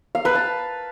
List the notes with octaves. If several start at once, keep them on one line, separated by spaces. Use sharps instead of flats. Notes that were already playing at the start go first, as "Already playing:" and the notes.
F5
B4
A5